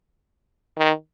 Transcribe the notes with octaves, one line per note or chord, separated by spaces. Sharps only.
D#3